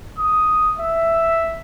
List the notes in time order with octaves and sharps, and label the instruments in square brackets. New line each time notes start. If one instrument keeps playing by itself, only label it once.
[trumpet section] D#6
E5